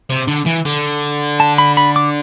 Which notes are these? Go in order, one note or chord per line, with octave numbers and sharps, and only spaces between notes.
C3
D3
E3
D3
A5
B5
B5
D6